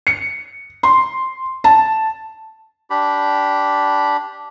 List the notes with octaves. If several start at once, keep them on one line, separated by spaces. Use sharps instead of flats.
C#7
C6
A5
D4 G4 B5